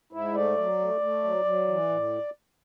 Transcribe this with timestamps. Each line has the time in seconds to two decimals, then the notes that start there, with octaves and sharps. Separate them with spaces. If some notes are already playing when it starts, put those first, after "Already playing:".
0.13 G#2 E4
0.34 A3 D5
0.57 F#3
0.79 A3
1.01 A3
1.24 F#3
1.45 F#3
1.68 E3
1.89 A2